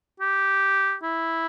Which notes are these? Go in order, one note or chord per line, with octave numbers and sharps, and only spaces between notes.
G4
E4